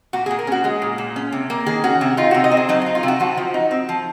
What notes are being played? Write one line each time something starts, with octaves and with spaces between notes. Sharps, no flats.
A#2 F#4
G#4
A#2
A#4
C#4 F#4
G#3 G#4
A#2
A#2
C#4
C3
A#3
D#3 G#4
C#4 F#4
C3 F#4
D#4 F4
C3 F#4
D#5
C4
G#4
F#3 D#4
F4
D#4
F4
C3 F#4
F3 F#4
F3
D#4
C4
F3